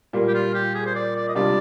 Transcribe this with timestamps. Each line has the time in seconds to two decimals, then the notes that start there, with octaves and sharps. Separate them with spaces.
0.13 A#2 G3 A#3
0.28 G4
0.34 F4
0.54 G4
0.74 G#4
0.86 C5
0.95 D5
1.16 D5
1.28 D#5
1.35 C3 G3 D4 F4 D5